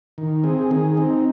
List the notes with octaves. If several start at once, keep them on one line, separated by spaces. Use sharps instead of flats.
D#3
C4 G#4
D#3 G#4
C4 D#4